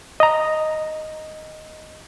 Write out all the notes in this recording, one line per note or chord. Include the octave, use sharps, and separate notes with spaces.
D#5 A#5